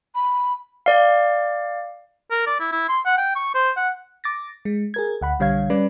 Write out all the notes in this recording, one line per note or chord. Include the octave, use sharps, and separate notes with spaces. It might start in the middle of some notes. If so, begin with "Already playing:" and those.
B5
D5 F5
A#4
D5
E4
E4
C6
F#5
G5
C#6
C5
F#5
D6 A6 A#6
G#3
G#4 A#4 G#6
D2 F#5 B5
B1 D3 G3 C#5 F5 G#6
G3 C#4 B4 D5